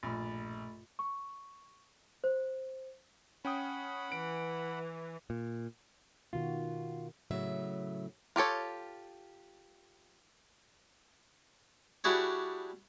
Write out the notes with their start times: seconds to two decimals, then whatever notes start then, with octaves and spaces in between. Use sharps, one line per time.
0.03 A#1 G2 B2 A3 F4 B5 A6
0.99 C#6
2.24 C5
3.45 C#4 F#5 G5 B5 D#6
4.12 E3 D7
5.30 A#2
6.33 B2 D#3 F4 F#4
7.31 A2 C#3 F#3 E5
8.36 F4 G4 A4 C#5
12.04 G3 D4 E4 F#4 G#4 C#5